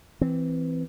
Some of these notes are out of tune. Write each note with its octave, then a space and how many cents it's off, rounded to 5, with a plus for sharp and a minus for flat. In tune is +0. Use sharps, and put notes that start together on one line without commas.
E3 +0 C4 -10